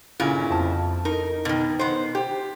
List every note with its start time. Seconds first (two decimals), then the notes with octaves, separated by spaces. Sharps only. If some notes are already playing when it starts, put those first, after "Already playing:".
0.20 G1 A#2 C#3 E4
0.51 F2 A5
1.05 D#4 A#4
1.45 B2 D#3
1.79 B3 C5
2.15 G4